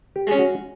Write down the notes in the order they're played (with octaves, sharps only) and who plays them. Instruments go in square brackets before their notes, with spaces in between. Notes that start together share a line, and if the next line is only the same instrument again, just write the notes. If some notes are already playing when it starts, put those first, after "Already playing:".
[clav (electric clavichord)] G4
[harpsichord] G#3 C#4
[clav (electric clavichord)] F#4